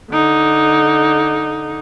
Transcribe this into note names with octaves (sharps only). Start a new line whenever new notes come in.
D3 D#4